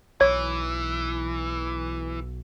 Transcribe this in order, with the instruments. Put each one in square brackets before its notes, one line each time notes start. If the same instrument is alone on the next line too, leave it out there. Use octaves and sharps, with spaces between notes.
[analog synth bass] B1 [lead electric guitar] E3 [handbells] C#5